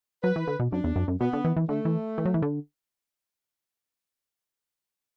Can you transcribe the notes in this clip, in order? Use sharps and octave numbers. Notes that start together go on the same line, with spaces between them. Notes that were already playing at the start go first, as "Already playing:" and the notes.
F#3 B4
E3
D3
B2
F#2 D4
E2
F#2
F#2
B2 B3
D3
E3
E3
D3 A3
E3
E3
F#3
E3
D3